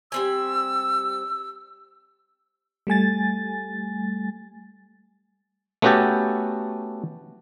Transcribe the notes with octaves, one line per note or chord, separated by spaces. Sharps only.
G3 C4 G#5 E6
G3 A3 G#5 A6
A3 B3 C#4 F#4 G4 A4